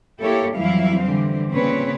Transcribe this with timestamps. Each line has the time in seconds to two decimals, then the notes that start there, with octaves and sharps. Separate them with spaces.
0.21 A#3 E4 G4 A4 C#5
0.56 F2 E3 F#3 G3 E4 F5
1.01 D3 E3 G3 C4
1.51 A#2 C#3 C4 C#4 B4 C#5